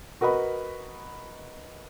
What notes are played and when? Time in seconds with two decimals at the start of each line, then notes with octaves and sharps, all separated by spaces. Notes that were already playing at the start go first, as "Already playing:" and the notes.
0.21 F#4 A#4 B4 D#5 B5